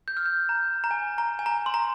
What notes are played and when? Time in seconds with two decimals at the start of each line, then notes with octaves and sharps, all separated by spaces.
0.08 G6
0.17 F6
0.26 G6
0.49 A#5
0.84 A#5
0.91 G#5
1.18 A#5
1.39 G#5
1.46 A#5
1.66 C6
1.74 A#5